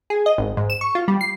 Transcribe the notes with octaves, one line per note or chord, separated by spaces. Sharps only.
G#4
D#5
G#1
G#2
E7
C#6
F4
G3
C7